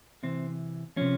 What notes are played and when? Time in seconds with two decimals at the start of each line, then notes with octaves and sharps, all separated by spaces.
0.23 C3 E3 C4
0.97 C3 F3 C#4